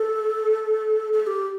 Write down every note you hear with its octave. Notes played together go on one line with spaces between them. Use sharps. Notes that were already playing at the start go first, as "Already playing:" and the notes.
Already playing: A4
A4
A4
G4